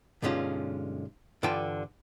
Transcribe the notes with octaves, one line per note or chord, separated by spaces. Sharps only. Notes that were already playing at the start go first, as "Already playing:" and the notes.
B1 G2 D3 G#3 C#4 F4
G2 D3 E3 F4 G5 A5